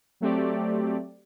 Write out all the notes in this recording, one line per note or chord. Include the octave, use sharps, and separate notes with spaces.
F#3 A3 C4 G4 D5